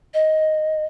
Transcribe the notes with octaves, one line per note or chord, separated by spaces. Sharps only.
D#5